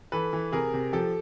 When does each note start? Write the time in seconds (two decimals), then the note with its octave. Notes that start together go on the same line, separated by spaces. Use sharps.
0.12 E3 A4 B4
0.33 E3
0.52 C3 G#4 A#4
0.74 C3
0.93 F3 G4 A4